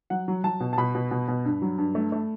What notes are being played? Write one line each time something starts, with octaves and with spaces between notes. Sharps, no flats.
F#3 F#5
F#3
F#3 A5
B2
A5
B2 B5
B2
B2
B2
G2
F#3
G2
A3
A3